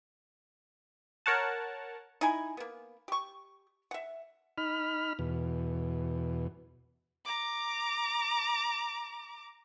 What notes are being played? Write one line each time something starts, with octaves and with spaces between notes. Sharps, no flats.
A#4 C#5 F#5 A5
D#4 E4 G#5 B5
A#3 B3
G4 C#6
E5 F#5
D#4 B5 F6
E2 B2
A#5 D6